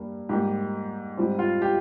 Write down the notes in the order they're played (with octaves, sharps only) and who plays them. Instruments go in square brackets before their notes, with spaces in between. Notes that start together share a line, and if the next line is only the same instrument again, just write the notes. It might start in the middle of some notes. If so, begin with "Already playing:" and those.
Already playing: [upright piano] G2 G3 A#3
G#2 G3 A#3 G4
G#2 G3 C4
F4
G4